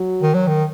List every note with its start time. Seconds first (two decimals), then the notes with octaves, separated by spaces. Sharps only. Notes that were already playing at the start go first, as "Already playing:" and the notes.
Already playing: F#3
0.22 D#3
0.34 F#3
0.47 D#3